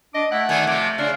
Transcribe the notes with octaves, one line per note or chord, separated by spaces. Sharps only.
D4 D#5 D6
A3 E4 F#5
D#3 G3 G#5
C3 F3 D6
C#3 D4 F4